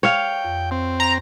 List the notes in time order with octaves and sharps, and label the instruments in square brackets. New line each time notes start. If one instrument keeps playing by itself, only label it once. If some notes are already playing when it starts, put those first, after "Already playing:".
[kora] C#5 F5 [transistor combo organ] G5
[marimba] F2
[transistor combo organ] C4
[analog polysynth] A#5